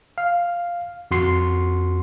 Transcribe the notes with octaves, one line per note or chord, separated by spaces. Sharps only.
F5
F2 F#4 C6 C7